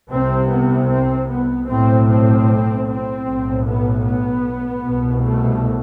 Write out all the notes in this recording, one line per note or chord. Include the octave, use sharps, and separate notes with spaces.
C2 C3 C4
B3
C4
B3
B1 A2 C4
C4
C4
B1 A2
B3
B3
C2 B2
A3